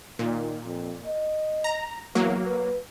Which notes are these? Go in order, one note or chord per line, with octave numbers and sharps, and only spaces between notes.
A#2 D#3
F2
D#5
A#5
E2 F#3 A#3
B4